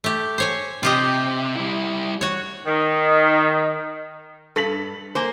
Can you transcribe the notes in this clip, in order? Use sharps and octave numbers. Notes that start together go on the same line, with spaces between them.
A3 G4
C5 C#5 G#5
C3 F4 G4 D#5
G3 E4
F#4 C#5
D#3
G2 A4 B6 F#7
A#3 C5 G#5